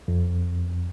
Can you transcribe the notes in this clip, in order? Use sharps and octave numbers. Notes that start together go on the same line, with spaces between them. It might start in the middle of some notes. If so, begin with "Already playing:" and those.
F2